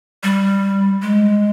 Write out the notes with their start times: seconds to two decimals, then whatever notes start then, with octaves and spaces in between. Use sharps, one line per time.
0.23 G3
1.02 G#3